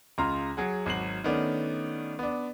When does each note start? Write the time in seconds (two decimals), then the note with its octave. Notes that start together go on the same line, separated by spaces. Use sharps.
0.18 C#2 C#3 F4 A#5 C6 F6
0.57 F#3 G#4 F#5
0.86 G#1 F#3 C7 F#7
1.24 D#3 A3 B3 C#4 D4
2.19 B3 D4